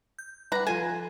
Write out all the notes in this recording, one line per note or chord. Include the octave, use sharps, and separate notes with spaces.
G6
G3 B4 F#5 A#5
F3 F4 A4 G#5